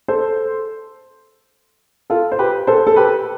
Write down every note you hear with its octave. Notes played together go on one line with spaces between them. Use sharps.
A4 C5
F4 A4
C5
G4 B4
A4 C5
A4
G4 B4